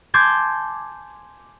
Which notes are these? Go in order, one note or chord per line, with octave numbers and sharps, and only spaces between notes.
G#5 A5 C6 D6 G6 G#6